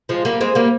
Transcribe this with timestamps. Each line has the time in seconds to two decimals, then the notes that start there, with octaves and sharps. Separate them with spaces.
0.09 F3 G#3
0.25 G3 A#3
0.40 G#3 C4
0.55 G3 A#3